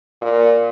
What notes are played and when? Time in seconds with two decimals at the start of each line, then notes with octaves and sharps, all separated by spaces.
0.22 A#2